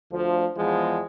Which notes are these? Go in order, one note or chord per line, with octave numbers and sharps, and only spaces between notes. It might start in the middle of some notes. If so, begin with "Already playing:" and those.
D2 F3
E2 F3 G#3 B3